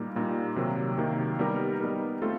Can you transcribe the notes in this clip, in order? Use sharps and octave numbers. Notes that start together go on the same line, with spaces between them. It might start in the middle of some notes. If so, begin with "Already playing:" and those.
Already playing: A#2 G3 A#3 D#4
A#2 G3 A#3 D#4
C3 D#3 F#3 A#3
C3 D#3 F#3 A#3
G3 B3 D#4 G4 A#4
G3 B3 D#4 G4 A#4
A3 C4 F4 A4